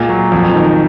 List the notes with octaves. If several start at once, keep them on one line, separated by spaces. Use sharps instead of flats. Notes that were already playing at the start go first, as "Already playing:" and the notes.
Already playing: A#2 G#3
F#3
F2
D#3